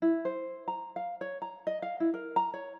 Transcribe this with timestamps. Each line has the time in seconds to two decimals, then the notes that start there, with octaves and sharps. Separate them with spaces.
0.02 E4
0.25 C5
0.68 A#5
0.96 F5
1.21 C#5
1.42 A#5
1.67 D#5
1.82 F5
2.00 E4
2.14 A#4
2.36 A#5
2.54 C#5